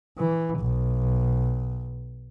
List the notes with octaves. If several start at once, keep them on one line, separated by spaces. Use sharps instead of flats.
E3
B1